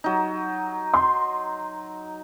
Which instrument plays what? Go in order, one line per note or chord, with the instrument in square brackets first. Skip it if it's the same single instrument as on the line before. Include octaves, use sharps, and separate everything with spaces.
[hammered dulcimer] F#3 D#4
[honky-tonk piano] C6